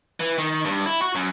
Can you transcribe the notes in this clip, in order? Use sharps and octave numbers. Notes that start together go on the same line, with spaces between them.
E3
D#3
G2
E4
F#4
F#2